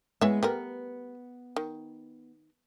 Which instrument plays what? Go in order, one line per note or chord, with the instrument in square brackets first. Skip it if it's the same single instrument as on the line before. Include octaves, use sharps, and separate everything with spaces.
[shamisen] E3 C#5 E5 [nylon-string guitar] G#3 B3
[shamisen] G3 A3 A#4 [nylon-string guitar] B3
[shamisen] D#3